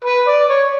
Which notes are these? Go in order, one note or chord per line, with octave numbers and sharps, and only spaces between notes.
B4
D5
C#5